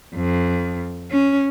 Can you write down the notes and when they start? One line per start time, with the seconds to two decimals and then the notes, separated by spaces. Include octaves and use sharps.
0.15 F2
1.11 C#4